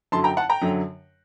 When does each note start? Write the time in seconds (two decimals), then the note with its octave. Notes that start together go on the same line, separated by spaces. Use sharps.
0.12 F#2 D3 F#3 A5 C6
0.24 G5 A#5
0.37 F#5 A5
0.49 G5 A#5
0.62 F#2 D3 F#3